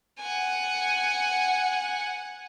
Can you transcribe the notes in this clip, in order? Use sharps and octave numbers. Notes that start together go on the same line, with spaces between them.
F#5 G#5